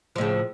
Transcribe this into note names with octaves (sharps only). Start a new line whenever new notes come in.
A2 C#3 F3